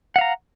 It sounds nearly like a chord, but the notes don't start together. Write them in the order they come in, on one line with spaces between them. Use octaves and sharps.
F#5 F5 A#5